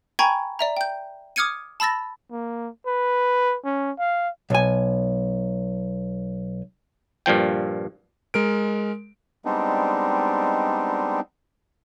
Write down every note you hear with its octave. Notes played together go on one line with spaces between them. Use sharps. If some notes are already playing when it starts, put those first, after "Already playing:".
G5 G#5 A#5 B5 C#6 G#6
D5 E5 A#5
G5 G6
D6 D#6 F6 G#6 C#7 D#7
A5 B5 E6 A6 A#6
A#3
B4
C#4
F5
B1 G#5
G2 A#2 F3 G5
G#3 A#4 D7
G3 G#3 B3 C4 D4 D#4